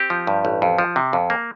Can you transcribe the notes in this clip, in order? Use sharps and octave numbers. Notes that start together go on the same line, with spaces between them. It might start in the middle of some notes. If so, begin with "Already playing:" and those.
Already playing: C4 G4
F3
G2
A1
F2
F3
C3
F2
A#3